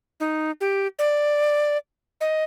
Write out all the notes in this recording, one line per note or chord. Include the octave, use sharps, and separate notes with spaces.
D#4
G4
D5
D#5